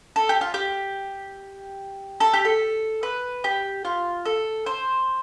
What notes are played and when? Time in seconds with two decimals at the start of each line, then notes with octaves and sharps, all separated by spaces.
0.16 A4
0.29 G4
0.41 F4
0.54 G4
2.20 A4
2.33 G4
2.45 A4
3.03 B4
3.44 G4
3.85 F4
4.25 A4
4.66 C5